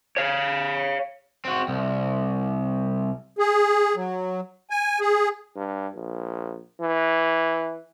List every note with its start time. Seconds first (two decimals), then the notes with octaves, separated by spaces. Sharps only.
0.17 C#5 F5
1.45 C4 F#4
1.68 C2
3.38 G#4
3.96 F#3
4.70 G#5
5.00 G#4
5.56 G2
5.96 A#1
6.81 E3